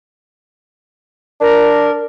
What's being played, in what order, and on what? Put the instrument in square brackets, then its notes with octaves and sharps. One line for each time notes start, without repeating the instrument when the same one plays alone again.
[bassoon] D4 [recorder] A#4